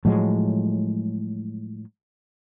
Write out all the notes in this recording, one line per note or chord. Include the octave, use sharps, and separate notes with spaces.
A2 F3 F#3 G#3